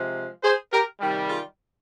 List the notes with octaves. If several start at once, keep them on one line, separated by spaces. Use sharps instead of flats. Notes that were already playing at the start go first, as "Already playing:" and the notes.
Already playing: C3 F3 G#3
G#4 C5
G4 A#4
C3 D#3 G3
F4 G#4